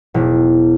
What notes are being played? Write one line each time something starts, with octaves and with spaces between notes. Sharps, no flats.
E1